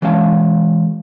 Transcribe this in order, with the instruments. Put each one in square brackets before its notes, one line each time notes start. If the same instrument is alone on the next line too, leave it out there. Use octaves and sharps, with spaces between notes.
[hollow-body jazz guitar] E3 G#3 C#4 F5 A5